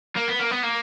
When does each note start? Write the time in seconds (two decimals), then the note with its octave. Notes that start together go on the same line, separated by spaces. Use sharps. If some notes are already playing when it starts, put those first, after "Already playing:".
0.16 A#3
0.28 B3
0.39 A#3
0.51 B3
0.63 A#3